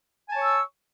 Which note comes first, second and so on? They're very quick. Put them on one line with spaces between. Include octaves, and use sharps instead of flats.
G#5 A5 C#5 C#6 E6